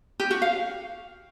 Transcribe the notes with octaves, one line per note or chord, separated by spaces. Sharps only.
G4
F#4
F5